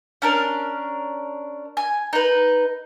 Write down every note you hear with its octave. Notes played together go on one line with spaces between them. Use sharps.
C#4 D4 A#4
G#5
D#4 B4